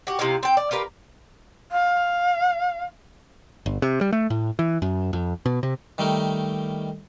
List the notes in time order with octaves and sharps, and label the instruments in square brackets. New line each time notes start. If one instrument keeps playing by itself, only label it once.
[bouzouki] F#4 G4
C3 D#4 E4 F5
C4 G5
D5
F4 G4 A#4 B4
[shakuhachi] F5
[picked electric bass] G1
C3
G3
A3
A2
E3
F#2
F2
B2
C3
[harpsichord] D#3 G3 A3 D#4 A#4